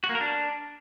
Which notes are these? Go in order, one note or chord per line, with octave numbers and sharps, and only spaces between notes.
F#4
A#3
A#4
D4